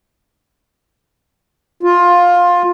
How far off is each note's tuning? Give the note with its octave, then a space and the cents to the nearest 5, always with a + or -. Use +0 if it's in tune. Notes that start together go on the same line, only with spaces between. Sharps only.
F4 +15